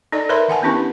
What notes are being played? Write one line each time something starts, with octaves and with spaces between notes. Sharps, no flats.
D#4 A4 D5 D#5
A#4 B4 C#5 E5 B5 C6
D#3 F#5 G#5 A5
B3 C#4 D4 E4 G4 B4